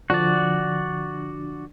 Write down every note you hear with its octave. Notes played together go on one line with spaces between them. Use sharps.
D3 F3 D4 F#4 D5